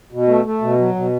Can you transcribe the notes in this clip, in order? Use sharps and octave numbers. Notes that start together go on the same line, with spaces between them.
B2
A3
A3
B2
F#3
B2